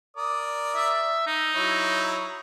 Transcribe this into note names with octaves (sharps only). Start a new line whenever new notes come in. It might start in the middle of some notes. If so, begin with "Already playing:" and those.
A#4 D5 D#6
E5
D#4
F#3 E4 C#5